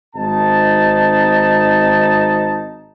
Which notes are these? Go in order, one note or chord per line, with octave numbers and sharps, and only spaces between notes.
G#1 C4 D#4 A5